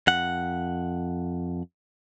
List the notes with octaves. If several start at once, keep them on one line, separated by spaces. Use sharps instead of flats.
F2 F#5